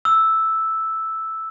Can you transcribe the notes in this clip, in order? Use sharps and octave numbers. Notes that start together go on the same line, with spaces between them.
E6